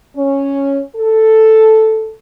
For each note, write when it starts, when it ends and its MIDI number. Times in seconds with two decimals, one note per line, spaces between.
0.16 0.79 61
0.96 2.14 69